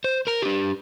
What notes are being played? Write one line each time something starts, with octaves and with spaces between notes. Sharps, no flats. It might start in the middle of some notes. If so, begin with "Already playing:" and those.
C5
A#4 A#5
D4 G4